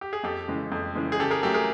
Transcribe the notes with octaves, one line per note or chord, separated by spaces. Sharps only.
G4
G#4
F2 G4 A4
C#3 E3 G#3
F2
C#3 E3 G#3
G#4
C#3 G4 A4
G#4 A#4
F#3 A3 G4 A4
G#4 A#4